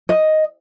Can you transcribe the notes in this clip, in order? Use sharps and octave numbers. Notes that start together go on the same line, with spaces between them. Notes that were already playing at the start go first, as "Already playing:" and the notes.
D#5